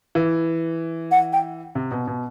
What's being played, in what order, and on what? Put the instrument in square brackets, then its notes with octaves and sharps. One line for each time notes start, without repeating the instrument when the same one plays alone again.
[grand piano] E3
[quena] F#5
G5
[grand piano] C3
B2
B2